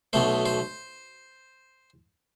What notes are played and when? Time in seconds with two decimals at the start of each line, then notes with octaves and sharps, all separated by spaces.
0.13 B1 B2 A3 C5
0.46 C5